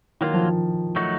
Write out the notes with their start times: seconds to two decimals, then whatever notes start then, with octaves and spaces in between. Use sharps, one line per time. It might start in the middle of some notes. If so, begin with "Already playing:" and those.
0.21 D#3 F#3 A#3 F4
0.34 F3
0.96 F#3 A3 D#4 F#4